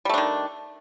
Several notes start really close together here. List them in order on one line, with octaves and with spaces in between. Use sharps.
G3 A3 D4 D#3